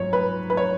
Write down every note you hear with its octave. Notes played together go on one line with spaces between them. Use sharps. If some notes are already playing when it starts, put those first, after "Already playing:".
Already playing: G#2 F#3 C#5
B4
B4
C#5